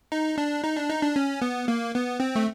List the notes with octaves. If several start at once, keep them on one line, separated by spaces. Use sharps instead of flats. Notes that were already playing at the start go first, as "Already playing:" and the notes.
D#4
D4
D#4
D4
D#4
D4
C#4
B3
A#3
B3
C4
A3